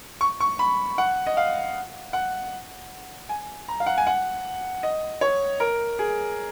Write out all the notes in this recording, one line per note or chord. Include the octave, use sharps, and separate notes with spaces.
C#6
C#6
B5
F#5
D#5
F5
F#5
G#5
A#5
F5
F#5
G#5
F#5
D#5
C#5
A#4
G#4